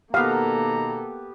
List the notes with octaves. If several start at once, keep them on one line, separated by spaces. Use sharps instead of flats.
B2 D#3 A#3 B3 G4 A4 F5 A#5